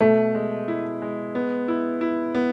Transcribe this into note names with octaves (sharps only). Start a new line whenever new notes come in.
B2 A3
G#3
E4
G#3
B3
E4
E4
B3